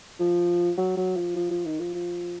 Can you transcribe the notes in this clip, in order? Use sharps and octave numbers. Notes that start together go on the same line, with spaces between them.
F3
F#3
F#3
F3
F3
F3
D#3
F3
F3